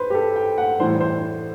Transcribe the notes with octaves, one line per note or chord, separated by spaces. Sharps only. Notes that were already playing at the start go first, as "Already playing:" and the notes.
Already playing: B4 C5
G4
A4
G5
F#5
A2 E3 G3 C5
C5